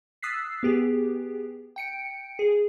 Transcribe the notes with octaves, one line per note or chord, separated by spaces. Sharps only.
D#6 E6 F#6 A6 B6 C7
B3 G4 G#4
G5 C#7 D7
G#4